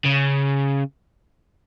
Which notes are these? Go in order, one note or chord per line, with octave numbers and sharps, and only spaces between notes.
C#3